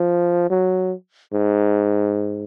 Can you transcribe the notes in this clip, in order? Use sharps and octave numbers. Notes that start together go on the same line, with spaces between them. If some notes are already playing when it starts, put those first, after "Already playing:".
Already playing: F3
F#3
G#2